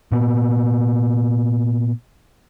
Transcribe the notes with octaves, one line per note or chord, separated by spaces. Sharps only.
A#2 B3